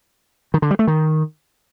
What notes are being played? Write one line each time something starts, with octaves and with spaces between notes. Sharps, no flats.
D#3
D3
G3
A3
D#3